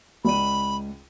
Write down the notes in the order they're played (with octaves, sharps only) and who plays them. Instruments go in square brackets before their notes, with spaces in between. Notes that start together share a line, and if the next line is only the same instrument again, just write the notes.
[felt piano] C#2 D5 D#7 [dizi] B5